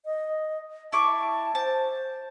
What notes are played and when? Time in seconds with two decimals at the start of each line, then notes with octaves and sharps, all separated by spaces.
0.05 D#5
0.92 E4 A5 C#6 D6
1.55 C5 A5